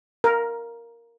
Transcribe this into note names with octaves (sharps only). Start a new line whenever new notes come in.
A#4